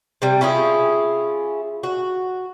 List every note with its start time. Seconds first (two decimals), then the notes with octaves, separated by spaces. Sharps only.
0.22 C3 G3
0.41 C#4 E4 F4 G#4
1.83 F#4